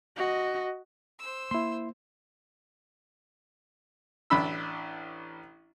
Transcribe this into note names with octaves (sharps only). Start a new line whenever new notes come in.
F#4 D#5
C5 E6
A#3 E4 C6
A1 D4 B5 E6